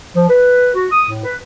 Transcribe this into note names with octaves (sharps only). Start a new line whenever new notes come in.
F3
B4
F#4
D#6
A2
B4